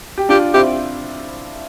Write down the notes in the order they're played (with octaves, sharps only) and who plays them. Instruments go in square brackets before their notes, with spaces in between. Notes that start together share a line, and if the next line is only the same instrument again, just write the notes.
[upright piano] G4
[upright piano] D4 F4 [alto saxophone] G4
[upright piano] C4 E4 [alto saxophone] G4